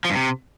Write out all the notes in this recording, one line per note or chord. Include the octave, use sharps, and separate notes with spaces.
F3
G2
C3